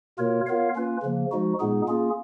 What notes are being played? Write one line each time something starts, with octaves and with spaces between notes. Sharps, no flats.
B2 A#3 F4 A#4 C#5
B3 F4 A#4 C#5 F5
A#3 C#4 F4 B4
C#3 F3 A#3
F3 G#3 D#4 F#4
A#2 G#3 B3 D#4 G#4
A#3 C#4 F4 G#4